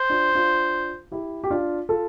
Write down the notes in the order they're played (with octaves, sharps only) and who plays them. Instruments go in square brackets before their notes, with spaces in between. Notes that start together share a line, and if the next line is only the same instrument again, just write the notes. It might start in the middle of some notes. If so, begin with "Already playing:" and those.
Already playing: [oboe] C5
[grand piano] D4 F4
D4 F4
E4 G4
G4
D4 F4
F4 A4